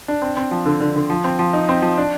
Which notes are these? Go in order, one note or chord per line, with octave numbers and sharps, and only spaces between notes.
D4
C4
C4
F3
D3
D3
D3
F3
C4
F3
D#4
C4
F3
D4